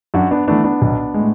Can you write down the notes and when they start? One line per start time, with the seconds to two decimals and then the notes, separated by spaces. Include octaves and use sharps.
0.14 F#2 D4 F#4
0.31 B3 D4
0.47 E3 A3 B3 D4
0.64 B3 D4
0.82 B1
1.14 A2 G#3